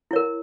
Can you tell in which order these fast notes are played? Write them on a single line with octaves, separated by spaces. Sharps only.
E4 C#5 A#4